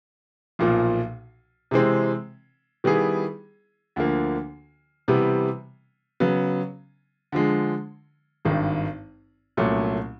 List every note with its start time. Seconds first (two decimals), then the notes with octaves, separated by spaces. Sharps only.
0.59 B1 A#2 F3
1.71 C3 E3 G#3 C4
2.84 D#3 G3 B3 E4 G#4
3.96 D2 D3 F3 A#3
5.08 C3 E3 G3 B3
6.20 C#3 F#3 B3
7.32 D3 F3 G#3
8.45 G#1 G2 D#3
9.57 C2 A#2 F#3 A3 C#4